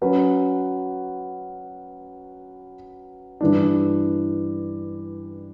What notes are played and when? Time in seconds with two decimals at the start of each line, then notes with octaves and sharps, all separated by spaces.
0.02 F#3 C#4 F#4 B4
3.41 G2 E3 G3 D4